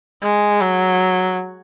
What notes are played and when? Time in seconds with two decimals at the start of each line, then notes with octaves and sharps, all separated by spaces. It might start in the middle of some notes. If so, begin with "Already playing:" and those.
0.22 G#3
0.61 F#3